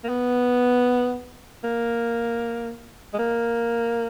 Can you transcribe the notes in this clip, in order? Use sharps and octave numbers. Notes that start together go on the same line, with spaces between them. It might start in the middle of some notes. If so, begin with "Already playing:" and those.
A#3
B3
A#3
G#3
A#3